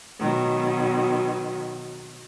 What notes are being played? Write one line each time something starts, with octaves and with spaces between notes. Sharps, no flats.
B2 D#3 F#3